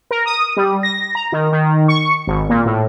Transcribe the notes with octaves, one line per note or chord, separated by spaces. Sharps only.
A#4
D#6
G3
A#6
A#5
D#3
D#3
C#6
G#1
A#2
A2